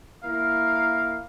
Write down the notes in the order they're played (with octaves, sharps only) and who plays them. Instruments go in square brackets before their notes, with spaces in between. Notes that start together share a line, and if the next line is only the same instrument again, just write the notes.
[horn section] A#3 E4 A#4 F5